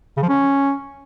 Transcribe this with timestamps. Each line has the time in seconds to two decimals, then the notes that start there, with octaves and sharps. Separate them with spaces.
0.17 C#3
0.23 F3
0.29 C#4